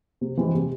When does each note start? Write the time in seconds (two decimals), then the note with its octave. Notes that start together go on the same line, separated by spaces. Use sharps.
0.21 C3
0.37 E3 G#3 C4
0.54 C3